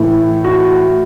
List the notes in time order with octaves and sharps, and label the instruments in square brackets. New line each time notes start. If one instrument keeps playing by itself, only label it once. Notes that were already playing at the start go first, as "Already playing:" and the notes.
Already playing: [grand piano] A2 E3
F#4